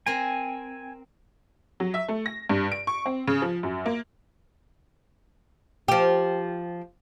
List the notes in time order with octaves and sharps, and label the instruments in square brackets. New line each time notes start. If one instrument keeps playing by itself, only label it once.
[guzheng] C4 A#4 [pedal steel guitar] G#5
[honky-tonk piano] F#3
E5
A3
A#6
G2
D7
C#6
C4
C#3
F3
F#2
A#3
[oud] F3 G4